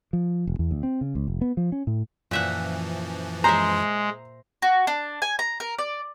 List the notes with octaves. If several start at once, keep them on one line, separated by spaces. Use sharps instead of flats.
F3
E1
E2
D2
C4
C#3
C#2
F1
B3
F3
C#4
A2
F#2 A#2 E3 F3 E5 F#5
G#3 C5 E5 A#5
F#4
D4
G#5
A#5
A#4
D5